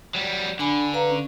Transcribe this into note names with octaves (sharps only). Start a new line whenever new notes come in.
F#3 G3
D3 D4 G#5 B5
B4 F5 A#5
C#4